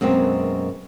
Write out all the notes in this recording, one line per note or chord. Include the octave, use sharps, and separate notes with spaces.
F#2 B2 G#3 A#3 C4